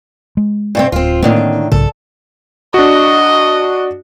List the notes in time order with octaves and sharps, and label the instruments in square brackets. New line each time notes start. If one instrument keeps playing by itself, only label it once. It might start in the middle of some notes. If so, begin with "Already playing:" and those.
[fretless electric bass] G#3
[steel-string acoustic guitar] G2 C3 C4
[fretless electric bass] D1 [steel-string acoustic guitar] C4 F4
[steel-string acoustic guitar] A2 D3 D#3 [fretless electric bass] A#3 C4
[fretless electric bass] B1 G#2 C#3 [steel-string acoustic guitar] A4
[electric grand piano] D4 F#4 [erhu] D#5